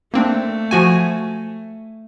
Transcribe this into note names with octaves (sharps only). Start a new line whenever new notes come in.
A3 A#3 C4 D4
F3 F#4 G#5